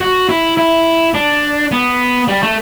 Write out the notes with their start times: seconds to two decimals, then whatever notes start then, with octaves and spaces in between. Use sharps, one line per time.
0.01 F#4
0.29 E4
0.58 E4
1.14 D4
1.71 B3
2.28 G3
2.43 A3